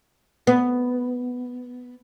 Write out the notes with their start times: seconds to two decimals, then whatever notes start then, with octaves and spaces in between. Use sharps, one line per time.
0.47 B3